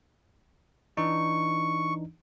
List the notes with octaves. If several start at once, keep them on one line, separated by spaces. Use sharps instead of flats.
E3 D4 D#4 C#6